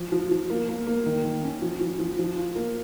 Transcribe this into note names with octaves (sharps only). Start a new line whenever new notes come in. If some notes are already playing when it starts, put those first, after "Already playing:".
Already playing: F3
F3
F3
A#3
A#3
A#3
D#3
D#3
C#4
F3
F3
F3
F3
F4
A#3